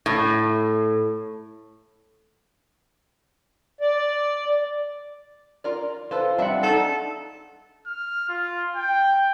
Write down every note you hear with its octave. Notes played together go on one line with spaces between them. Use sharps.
A2
D5
F4 A#4 D5
F4 A4 B4 C5
G3 C4 D4 E5 F#5
D#4 A4
F6
F4
G5